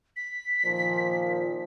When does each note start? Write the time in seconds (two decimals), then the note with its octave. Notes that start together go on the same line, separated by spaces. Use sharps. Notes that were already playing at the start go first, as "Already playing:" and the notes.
0.16 B6
0.65 A#2 D#3 F3